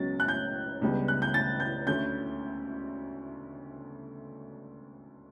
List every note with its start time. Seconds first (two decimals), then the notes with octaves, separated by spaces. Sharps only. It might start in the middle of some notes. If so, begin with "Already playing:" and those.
Already playing: C#2 B2 F#3 C#4 A6
0.20 F#6
0.28 G6
0.81 C#2 C#3 G3 B3 D4
1.08 F#6
1.22 G6
1.34 A6
1.60 G6
1.87 D2 D3 A3 C#4 G6